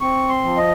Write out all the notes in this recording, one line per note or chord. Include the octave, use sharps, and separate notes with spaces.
C4 C#6
C6
F3
D#5